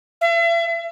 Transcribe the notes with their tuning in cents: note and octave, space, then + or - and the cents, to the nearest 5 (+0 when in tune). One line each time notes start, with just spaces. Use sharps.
E5 +40